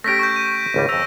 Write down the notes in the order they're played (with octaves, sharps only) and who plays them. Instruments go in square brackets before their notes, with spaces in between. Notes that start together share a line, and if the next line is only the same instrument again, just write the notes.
[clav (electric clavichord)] A3 C#4 G4 [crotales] A#6 B6 D7
[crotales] C#6 G6
D#7
[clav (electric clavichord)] G#1 C#2 G3
[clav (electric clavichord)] F2 A#5 [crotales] E6 A#6